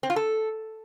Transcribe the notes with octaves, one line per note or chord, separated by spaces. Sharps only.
C4
F4
A4